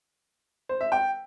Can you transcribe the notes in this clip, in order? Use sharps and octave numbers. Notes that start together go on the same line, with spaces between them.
C5
E5
G5